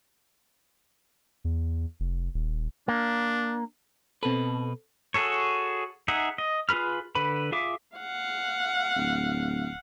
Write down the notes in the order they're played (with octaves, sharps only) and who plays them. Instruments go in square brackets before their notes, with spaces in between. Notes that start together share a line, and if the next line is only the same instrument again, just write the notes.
[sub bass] E2
F1
D#1
[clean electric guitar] A#3 [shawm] D4
[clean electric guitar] B2 B4 [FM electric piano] C4 A4
[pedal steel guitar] F#4 G#4 A4 C#5
D#4 G#4 E5 F#5
D#5
F4 G#4 B4 B5 F6
D3 B4 B5
F4 G#4 E5 D6
[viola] F5 F#5
[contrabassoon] D1